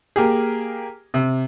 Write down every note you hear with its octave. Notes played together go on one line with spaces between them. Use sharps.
A#3 G4 G#4
C3